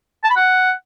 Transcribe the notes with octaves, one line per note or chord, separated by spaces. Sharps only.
A5
B5
F#5